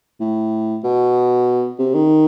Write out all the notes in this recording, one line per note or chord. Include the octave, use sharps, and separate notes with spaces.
A2
B2
C3
D#3